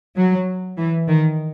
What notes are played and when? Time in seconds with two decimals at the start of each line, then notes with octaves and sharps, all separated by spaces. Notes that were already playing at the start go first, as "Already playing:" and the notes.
0.17 F#3
0.78 E3
1.08 D#3